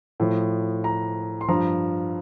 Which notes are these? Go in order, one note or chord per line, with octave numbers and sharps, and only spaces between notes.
A2 F3
A#5
C6
G2 F3 A#5